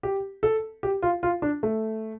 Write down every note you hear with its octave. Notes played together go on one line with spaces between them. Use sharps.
G4
A4
G4
F4
F4
D4
A3